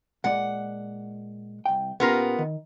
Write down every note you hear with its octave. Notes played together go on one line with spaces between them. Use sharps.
A#2 G#3 D5 F#5
C2 G5
A#2 B3 C#4 F4 G4 A#4
D#3